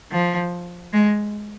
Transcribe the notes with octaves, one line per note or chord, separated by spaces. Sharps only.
F3
G#3